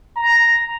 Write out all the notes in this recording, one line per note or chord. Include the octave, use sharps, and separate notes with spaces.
A#5